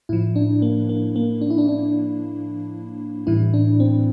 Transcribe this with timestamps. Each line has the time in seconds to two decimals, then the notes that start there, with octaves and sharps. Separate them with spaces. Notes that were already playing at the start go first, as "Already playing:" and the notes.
0.09 A2 F3 E4
0.36 D4
0.62 A#3
0.89 A#3
1.16 A#3
1.41 D4
1.50 E4
1.58 D4
1.68 D4
3.27 A2 E3 G3 E4
3.54 D4
3.80 C4